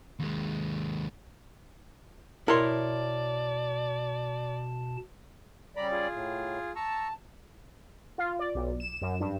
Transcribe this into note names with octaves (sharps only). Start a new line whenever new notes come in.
D#2 G#3
B2 E4 A#4 C#5 D5 A5 C6
C#3 G3 D5 A#5 B5
F4 G#4
A2
A5 A#5 C#6 E6
F4
D5
B1
E7
F#2
G2